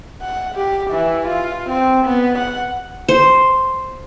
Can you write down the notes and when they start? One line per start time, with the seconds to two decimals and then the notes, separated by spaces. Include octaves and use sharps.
0.22 F#5
0.55 G4
0.90 E3
1.27 F4
1.69 C4
2.05 B3
2.38 F#5
3.09 C5